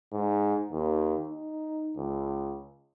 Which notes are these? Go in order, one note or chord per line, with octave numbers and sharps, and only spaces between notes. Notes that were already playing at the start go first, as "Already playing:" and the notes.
G#2
D#2
D#4
C#2